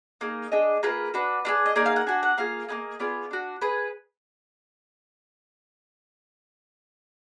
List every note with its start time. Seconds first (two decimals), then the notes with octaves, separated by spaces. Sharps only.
0.21 A#3 D#4 G#4 D#5
0.52 D4 G#4 D#5
0.83 A#3 F4 G#4 B4
1.14 D4 F#4 B4
1.45 D4 F4 G#4
1.66 D#5
1.75 A#3 D#4 G#4 D5
1.86 F5
1.96 F#5
2.07 D4 F#4 G#5
2.23 F#5
2.38 A#3 F4 G#4 F5
2.68 A#3 D#4 G#4 D#5
3.00 B3 F4 G#4 D5
3.31 D4 F#4
3.61 G#4 B4